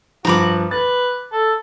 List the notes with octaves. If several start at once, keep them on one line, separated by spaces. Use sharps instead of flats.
G2 F3 F#4 A#5 B5 D6
B4 A6
A4